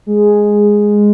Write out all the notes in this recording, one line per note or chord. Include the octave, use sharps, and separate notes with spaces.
G#3